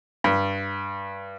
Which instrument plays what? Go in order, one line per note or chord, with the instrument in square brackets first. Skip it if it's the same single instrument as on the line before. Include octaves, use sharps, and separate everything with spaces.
[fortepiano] G2